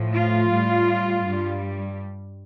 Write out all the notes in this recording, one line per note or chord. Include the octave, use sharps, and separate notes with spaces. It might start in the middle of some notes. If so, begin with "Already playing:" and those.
Already playing: A2 F3
F4
A2 G3
G2 G3